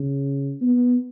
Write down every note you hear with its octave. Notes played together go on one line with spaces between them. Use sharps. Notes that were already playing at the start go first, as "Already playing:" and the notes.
Already playing: C#3
B3